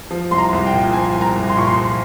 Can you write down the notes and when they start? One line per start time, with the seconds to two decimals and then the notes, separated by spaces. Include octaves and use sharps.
0.11 F3
0.31 C2 C6
0.38 A#5
0.52 C2
0.66 G5
0.73 A#2
0.93 F3 G#5
1.14 C2
1.21 A#5
1.36 C2
1.49 C6
1.57 A#2 C#6
1.67 C6
1.78 F3